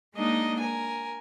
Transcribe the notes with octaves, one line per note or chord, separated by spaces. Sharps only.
G#3 A#3 D4 D#4 D#5
A#4 G#5